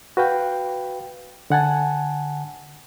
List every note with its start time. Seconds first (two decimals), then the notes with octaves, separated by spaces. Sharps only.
0.17 F#4 B4 F5 G5
1.50 D3 F#5 G#5 A5